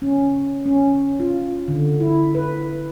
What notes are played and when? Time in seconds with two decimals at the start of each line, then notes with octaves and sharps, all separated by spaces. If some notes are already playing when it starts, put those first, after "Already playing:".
0.02 C#4
0.66 C#4
1.20 F4
1.68 D3
2.00 E4
2.35 B4